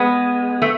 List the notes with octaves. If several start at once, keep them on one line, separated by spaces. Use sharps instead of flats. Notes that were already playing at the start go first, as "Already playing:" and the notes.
Already playing: G#3 B3
A3